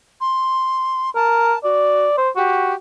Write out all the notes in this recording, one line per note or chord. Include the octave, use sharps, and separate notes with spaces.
C6
A#4 A5
F#4 D5
C5
F#4 G4